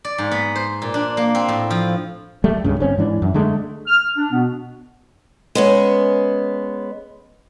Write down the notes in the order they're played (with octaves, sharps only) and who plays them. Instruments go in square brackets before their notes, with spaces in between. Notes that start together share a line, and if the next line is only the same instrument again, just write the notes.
[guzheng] D5
G#2
B3
C5
A#2
D4
A#3
C4
A2
F3
[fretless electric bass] G3 A3
C#2 G2 C#3
G1 C4 C#4
G#2 E3 D4
F#2
D3 G#3 A3
[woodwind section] F6
D4
B2 B3
[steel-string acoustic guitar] G#3 B3 C#4